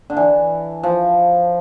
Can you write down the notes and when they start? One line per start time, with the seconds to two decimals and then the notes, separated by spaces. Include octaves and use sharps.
0.10 D3
0.17 E3
0.83 F3